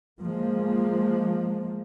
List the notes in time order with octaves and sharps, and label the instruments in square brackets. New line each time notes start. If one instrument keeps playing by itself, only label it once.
[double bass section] F3 G#3 A#3